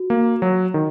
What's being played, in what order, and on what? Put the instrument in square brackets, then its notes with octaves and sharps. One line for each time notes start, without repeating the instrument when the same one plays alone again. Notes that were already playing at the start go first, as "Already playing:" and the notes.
Already playing: [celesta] F#4
[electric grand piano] A#3
F#3
D#3